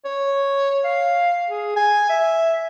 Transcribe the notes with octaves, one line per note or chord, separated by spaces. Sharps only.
C#5
F5
G#4
G#5
E5